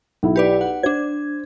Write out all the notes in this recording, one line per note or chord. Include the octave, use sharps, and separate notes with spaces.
B1 E4
G4 B4 D5
F#5
D4 C5 G#6